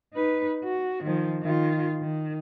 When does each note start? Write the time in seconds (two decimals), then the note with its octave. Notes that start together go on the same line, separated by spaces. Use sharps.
0.13 D#4 B4
0.65 F#4
1.03 D#3 F3
1.42 D#3 F4
2.01 D#3